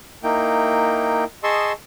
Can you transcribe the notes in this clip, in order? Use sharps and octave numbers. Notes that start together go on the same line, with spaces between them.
A#3 D#4 E4 G5
G#4 D#5 A5 C6 C#6 E6